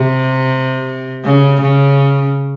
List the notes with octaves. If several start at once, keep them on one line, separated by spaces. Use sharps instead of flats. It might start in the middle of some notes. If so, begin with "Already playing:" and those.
Already playing: C3
C#3
C#3